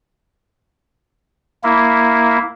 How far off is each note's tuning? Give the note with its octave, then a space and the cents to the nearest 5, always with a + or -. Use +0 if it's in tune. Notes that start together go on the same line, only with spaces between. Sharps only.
A#3 +0 E4 +0